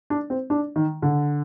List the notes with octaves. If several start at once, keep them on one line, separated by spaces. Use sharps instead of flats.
D4
C4
D4
D#3
D3